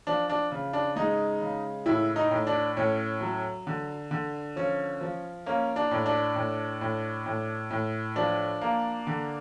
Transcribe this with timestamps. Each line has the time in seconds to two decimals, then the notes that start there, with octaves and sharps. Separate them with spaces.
0.07 F3 D4
0.30 D4
0.52 C#3
0.73 D4
0.96 G#3 D#4
1.41 C#3
1.86 A2 E4
2.16 D#4
2.31 A2
2.47 D4
2.77 A2 C#4
3.21 F#3
3.67 D3
4.11 D3
4.56 F3 C#4
5.01 F3
5.46 A#3 C#4
5.76 D4
5.91 A2
6.06 D4
6.36 A2
6.81 A2
7.26 A2
7.71 A2
8.16 F3 D4
8.61 A#3
9.07 D3